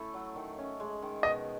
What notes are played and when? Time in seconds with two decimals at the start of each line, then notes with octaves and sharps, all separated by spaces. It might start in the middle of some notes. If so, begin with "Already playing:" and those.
Already playing: A3 C#4 E4 A4
0.14 F#3
0.36 D#3
0.58 C#4
0.80 G#3
1.02 D#3
1.23 B2 D#5